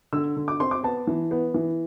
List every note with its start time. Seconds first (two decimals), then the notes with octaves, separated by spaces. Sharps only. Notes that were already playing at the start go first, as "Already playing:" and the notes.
0.13 D3 E6
0.37 D3
0.48 D6
0.60 C4 C6
0.71 D6
0.83 B3 A5
1.07 E3
1.31 B3
1.54 E3